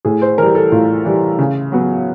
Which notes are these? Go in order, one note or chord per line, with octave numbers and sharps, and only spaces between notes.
A2 G#4
C5
E3 G3 A#4
A4
A2 F4
E3 G3
C#3
F#3 B3